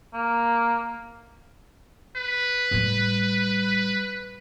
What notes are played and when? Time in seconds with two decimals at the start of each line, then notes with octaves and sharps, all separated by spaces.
0.14 A#3
2.16 B4
2.71 A2 G3